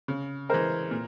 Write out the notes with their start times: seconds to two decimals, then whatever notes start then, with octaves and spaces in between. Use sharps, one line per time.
0.08 C#3
0.49 E3 G#3 A#4 C5
0.91 A#2